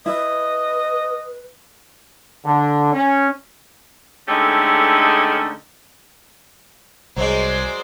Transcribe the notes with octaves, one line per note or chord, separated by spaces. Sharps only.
E4 B4 D#5
D3
C#4
D3 G#3 A3 C#4 D#4 G4
C2 F#3 G#3 C5 D5